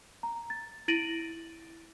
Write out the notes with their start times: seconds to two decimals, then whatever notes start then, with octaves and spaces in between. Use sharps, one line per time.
0.23 A#5
0.50 A6
0.88 E4 A6 A#6 D7 D#7 F#7